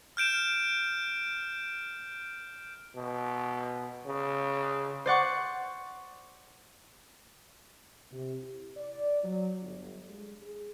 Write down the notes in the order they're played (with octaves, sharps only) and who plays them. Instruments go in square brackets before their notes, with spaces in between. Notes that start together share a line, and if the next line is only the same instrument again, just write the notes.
[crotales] F6 G6 D7 E7
[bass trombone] B2
C#3
[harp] C5 D5 F#5 C#6
[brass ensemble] C3
E4
D5
F#3
G1
G#3
G#4